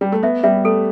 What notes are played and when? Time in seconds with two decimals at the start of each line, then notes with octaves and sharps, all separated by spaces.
0.01 G3
0.12 A3
0.23 B3 E5
0.44 G3 E5
0.65 A3 A4